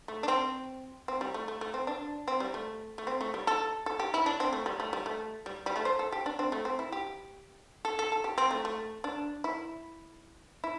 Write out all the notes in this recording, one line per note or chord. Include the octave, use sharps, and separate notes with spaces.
A3
D4
C4
C4
G3
A3
A3
A3
C4
D4
C4
G3
A3
A3
C4
A3
G3
A4
A4
G4
E4
D4
C4
A3
G3
A3
G3
A3
G3
G3
A3
C5
A4
G4
D4
C4
A3
C4
E4
G4
A4
A4
A4
G4
C4
A3
A3
D4
E4
E4